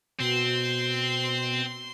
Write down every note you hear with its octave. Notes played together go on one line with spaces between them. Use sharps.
B2 C4 C6